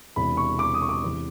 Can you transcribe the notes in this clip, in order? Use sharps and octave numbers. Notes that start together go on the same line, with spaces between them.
E1 E2 C3 B5
C#6
D6
D#6
C#6
D6
E2 C3